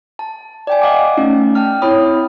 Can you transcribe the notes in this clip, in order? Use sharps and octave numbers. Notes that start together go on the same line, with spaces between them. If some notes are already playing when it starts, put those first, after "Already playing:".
A5
D5 G5 G#5
D#5 F5 F#5 A5 D6
A3 C#4 D#4
G5 A5 F6
C4 E4 C#5 B5 D#6